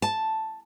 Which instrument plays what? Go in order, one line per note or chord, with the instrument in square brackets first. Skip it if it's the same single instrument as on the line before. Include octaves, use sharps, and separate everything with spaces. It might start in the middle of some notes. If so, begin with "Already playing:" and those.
[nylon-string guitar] A5